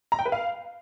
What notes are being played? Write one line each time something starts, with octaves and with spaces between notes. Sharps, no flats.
A#5
G5
B4
F5